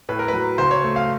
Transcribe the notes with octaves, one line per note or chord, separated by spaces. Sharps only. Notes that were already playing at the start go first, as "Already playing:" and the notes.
A2 B4
A#4
B4
F#3
C#2 C5
C#5
A3
F5